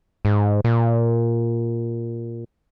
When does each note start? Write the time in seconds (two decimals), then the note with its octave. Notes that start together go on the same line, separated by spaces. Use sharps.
0.25 G#2
0.64 A#2